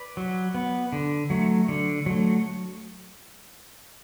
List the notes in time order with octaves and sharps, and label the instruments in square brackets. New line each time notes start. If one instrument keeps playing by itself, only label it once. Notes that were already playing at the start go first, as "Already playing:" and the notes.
Already playing: [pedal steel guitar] B4 D5
F#3
B3
D3
F#3 A3
D3
F#3 A3